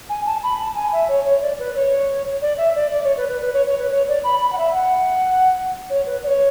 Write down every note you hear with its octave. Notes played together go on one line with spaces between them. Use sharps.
G#5
A5
B5
A5
G#5
E5
C#5
C#5
D5
B4
C#5
D5
E5
D5
D5
C#5
B4
B4
B4
C#5
C#5
B4
C#5
D5
B5
B5
F#5
E5
F#5
C#5
B4
D5
C#5